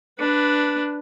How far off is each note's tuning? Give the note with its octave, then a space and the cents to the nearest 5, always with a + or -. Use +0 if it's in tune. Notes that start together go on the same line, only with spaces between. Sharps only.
D4 +0 B4 +0